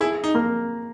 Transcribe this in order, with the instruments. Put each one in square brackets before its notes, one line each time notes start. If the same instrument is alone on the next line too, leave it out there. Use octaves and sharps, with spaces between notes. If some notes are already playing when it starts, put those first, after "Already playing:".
[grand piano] E4 [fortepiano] G#4
[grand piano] D#4
[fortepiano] A#3